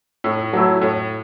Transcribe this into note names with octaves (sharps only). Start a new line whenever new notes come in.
A2
F#3 A3 E4
A2